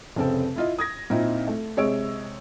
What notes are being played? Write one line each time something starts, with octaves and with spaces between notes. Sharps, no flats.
F1 C#3 C4 A4
E4 F4 D#5
D#6 G#6 A#6
A#2 C4 D#4 E4
A3
C3 G#3 C#5 D#5 E6 D7